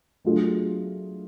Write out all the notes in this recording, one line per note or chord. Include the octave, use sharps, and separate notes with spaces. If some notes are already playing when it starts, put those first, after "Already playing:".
F#3 A3 D4 F4 G#4